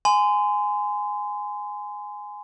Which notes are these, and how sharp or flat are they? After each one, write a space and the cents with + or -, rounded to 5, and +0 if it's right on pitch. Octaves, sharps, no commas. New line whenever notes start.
G#5 +0 C6 -30